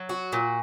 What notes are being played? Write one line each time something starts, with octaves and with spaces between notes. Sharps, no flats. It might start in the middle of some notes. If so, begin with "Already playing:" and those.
Already playing: F#3
F#4
A#2